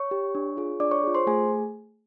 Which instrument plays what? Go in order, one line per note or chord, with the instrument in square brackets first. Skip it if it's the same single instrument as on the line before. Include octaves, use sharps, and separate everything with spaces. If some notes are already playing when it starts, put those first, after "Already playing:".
Already playing: [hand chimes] C#5 C#6
G4
D4
F4 G#4
D4 D5 D6
C#5 C#6
F4 G#4
C5 C6
A3 G#4 G#5